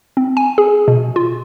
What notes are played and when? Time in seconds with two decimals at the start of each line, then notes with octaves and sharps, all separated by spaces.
0.17 C4
0.37 G#5
0.58 G#4
0.88 B2
1.16 F4